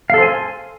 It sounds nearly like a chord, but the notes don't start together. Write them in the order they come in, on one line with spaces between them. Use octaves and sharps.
F5 A4 C5 G#5 C6